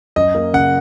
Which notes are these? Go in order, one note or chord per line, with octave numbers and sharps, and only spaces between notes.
F#2 D#5
A#3
C#3 F#5